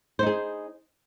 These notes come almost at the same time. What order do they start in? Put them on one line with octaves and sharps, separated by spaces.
C5 D#4 G#4